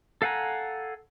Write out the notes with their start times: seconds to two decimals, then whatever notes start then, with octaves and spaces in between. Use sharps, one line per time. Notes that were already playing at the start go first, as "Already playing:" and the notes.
0.22 A4 F5 F#5 G#5 A#5